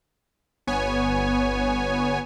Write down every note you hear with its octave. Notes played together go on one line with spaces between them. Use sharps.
G1 B3 C#5 G#5